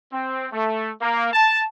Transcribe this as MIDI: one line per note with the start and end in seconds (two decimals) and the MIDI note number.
0.12 0.48 60
0.53 0.91 57
1.01 1.30 58
1.33 1.64 81